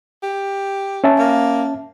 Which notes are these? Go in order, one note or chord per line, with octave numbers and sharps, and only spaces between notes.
G4
C#4 E5 A5
A#3